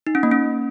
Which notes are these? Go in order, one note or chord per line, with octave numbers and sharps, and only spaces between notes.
D#4
C#4
A#3
C#4